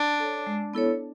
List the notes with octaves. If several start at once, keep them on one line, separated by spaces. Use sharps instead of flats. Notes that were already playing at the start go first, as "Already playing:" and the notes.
Already playing: D4
A4 C#5
G#3
B3 E4 A4 C#5